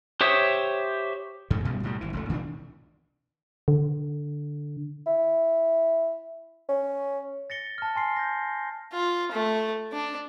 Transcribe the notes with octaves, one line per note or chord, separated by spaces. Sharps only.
G4 C5 C#5 E5 D#6
F2 G#2 D3 A3
F#2 B2 G3 G#3
B1 A2 E3 G3
G#1 E3
F1 C#2 A3
A#2 D#3 C#4 D4
D3
E4
C#4
A6 A#6 C#7 G7
A5 F6
G#5 C6 C7
G6 A#6
F4
A3
D4